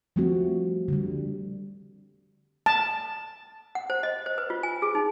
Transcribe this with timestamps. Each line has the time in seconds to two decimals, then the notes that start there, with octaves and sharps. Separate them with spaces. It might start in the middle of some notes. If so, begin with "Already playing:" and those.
0.16 F3 G3 A3 C4 F#4
0.88 D3 G3
2.66 A5
3.75 F#5
3.90 C5
4.03 D#5
4.26 C5
4.38 B4
4.50 F4
4.63 G#5
4.82 G#4
4.95 D#4